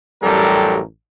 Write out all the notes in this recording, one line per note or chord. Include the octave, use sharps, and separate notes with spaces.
A1 F#2 G3 G4 A4 A#4